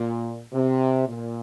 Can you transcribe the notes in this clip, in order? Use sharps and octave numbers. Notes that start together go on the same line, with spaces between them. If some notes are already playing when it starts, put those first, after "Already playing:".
Already playing: A#2
C3
A#2